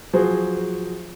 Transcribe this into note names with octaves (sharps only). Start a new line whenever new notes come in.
F3 F#3 F#4 G#4 C5